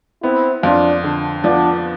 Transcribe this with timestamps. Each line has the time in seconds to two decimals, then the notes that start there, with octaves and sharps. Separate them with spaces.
0.23 B3 C4 E4
0.63 F2 D4 F4
1.04 D3
1.43 F3 B3 D4